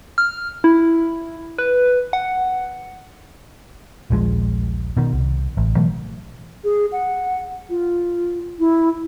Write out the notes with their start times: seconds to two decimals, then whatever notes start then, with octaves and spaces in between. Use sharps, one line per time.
0.18 F6
0.64 E4
1.58 B4
2.13 F#5
4.10 D#1 A#1 F3 G#3
4.97 B2 D#3
5.13 C2
5.57 A1
5.77 B2 E3 F#3 A3
6.64 G#4
6.92 F#5
7.70 F4
8.59 E4